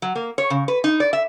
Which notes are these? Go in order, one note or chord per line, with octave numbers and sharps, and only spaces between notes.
F#3
A#3
C#5
C#3
B4
D#4
D5
E5